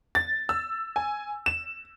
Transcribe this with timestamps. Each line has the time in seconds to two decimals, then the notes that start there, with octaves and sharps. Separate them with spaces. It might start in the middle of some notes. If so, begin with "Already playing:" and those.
0.15 A6
0.49 E6
0.96 G#5
1.46 E7